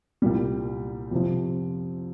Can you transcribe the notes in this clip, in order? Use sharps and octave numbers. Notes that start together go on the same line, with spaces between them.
C2 A#2 G3
F2 C3 F3